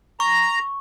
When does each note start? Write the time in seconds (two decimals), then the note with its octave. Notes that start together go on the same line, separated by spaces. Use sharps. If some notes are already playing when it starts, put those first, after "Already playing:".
0.20 A#5 C#6